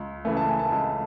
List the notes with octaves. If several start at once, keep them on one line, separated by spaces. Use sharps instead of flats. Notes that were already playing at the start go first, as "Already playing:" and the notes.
Already playing: C#2
C#3 E3 A3
A5
G#5
A5
C#2 A5